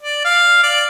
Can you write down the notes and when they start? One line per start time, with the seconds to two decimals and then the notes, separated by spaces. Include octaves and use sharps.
0.02 D5
0.25 F5
0.63 D5